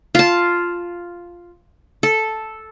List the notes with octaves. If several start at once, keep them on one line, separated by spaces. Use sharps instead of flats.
F4 A5
A4